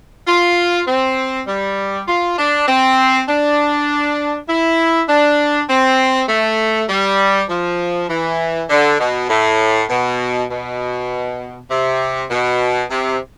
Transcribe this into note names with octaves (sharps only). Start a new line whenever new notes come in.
F4
C4
G3
F4
D4
C4
D4
E4
D4
C4
A3
G3
F3
E3
D3
B2
A2
B2
B2
C3
B2
C3